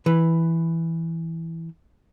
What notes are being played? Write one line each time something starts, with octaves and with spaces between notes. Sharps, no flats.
E3 B4